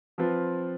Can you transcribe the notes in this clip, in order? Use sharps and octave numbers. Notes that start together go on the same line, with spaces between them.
F3 C4 F4 B4